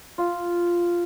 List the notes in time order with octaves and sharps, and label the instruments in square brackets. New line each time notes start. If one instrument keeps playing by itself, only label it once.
[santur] F4